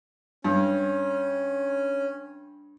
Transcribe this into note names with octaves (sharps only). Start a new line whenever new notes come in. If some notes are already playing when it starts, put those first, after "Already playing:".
G2 C#4